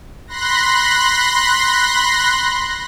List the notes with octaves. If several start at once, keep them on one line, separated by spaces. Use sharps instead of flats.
B5 C6 F#6 A#6